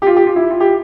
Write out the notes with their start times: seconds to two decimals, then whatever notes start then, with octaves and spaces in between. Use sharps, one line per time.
0.02 G4
0.07 F4
0.16 G4
0.27 F4
0.36 E4
0.50 F4
0.60 G4